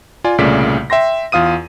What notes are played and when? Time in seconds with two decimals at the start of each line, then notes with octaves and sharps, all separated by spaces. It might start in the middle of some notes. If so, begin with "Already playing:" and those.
0.24 F4 D5 G#5
0.38 C2 A#2 C#3 A3 D5 B6
0.90 E5 G5 C6 A#6
1.32 E2 F4 F5 D#6 D#7